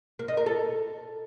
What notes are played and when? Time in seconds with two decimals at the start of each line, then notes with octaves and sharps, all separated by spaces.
0.19 A#3
0.28 D#4
0.37 A#4
0.46 A4